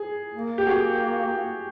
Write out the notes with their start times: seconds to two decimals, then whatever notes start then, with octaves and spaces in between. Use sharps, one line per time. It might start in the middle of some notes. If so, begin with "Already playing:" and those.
Already playing: G#4
0.34 A#3
0.58 G4
0.67 F#4 G#4